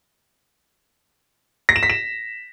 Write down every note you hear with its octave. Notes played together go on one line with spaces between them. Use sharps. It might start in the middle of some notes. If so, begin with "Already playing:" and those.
A#6
E7
B6
E7